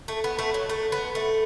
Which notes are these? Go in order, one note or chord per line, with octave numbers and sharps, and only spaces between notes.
A3
B3
A3
F#3
A3
B3
A3